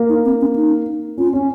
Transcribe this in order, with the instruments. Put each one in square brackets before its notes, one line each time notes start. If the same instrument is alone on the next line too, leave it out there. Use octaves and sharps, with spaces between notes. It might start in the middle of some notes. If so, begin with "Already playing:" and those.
Already playing: [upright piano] A#3
[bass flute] D#4
C4
C#4
D#4
[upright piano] C#4 [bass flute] F4
[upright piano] C#4